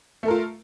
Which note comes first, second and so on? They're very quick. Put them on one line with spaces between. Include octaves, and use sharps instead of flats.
A3 A4 A#4 F4